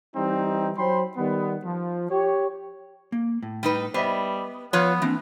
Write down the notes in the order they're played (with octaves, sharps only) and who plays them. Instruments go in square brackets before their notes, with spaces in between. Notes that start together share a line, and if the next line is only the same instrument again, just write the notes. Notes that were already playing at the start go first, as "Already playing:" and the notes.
[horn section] E3 G3 C4 D#4
F#3 C5 G5 B5 C6
D#3 G3 B3
F3
G4 C#5
[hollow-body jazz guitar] A#3
A2
[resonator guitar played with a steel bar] G3 D#4 B4
[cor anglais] G3 [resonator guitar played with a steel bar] B3 [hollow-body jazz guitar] C5 D#5 E5
[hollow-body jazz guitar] F3 [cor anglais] B3 [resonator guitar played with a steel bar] F4 B4 C#5
[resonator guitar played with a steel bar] E3 [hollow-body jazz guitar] A#3 C4 D4